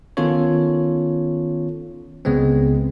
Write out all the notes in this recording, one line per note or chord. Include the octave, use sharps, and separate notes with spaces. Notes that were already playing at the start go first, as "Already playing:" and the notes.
D#3 B3 C#4 F4 A4 C#5
C#2 C#3 G#3 B3 C4